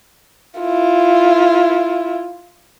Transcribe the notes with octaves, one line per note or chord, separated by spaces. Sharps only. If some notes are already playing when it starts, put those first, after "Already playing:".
E4 F4